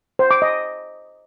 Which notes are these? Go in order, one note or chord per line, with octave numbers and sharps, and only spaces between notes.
C5
D6
D#5